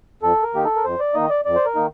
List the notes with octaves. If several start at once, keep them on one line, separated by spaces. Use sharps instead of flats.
F2 A4
A#4
D#3 A#3 D#4 G4
A4
A#4
F2 C5
D5
D#3 A#3 D#4 D#5
D5
F2 D5
C5
A#4
D#3 A#3 D#4